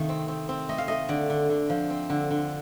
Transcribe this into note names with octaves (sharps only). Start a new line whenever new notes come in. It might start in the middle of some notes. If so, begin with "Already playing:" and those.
Already playing: C3 D#3 A3 F5
C4
C4
C4
A3 D#5
F5
A3 D#5
D3 D5
D3
D3
F3
C4
D3
D3